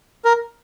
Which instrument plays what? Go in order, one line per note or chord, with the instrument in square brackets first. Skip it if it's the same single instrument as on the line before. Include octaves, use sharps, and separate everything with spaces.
[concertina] A#4